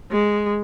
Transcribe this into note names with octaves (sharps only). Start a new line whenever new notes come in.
G#3